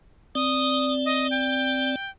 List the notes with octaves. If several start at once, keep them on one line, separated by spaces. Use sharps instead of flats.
C4 D5 D#6
D#5
G5